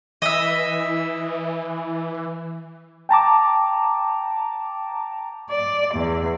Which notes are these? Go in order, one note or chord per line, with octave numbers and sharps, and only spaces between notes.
E3 D#5 E5
G5 A5 A#5 D6
D5
E2